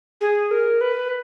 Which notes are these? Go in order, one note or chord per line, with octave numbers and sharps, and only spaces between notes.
G#4
A#4
B4